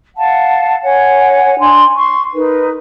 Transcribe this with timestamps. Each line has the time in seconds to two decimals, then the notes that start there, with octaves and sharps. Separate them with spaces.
0.16 F5 F#5 A5
0.82 C#5 F#5 G#5
1.59 D4 G#5 C6
1.95 C6 C#6
2.33 D#4 A#4 B4